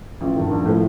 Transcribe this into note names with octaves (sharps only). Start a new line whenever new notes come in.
A1 F4
G2 D#3 A#4
A#1
A2 F3